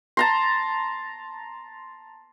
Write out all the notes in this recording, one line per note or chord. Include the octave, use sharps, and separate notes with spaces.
A5 A#5 C6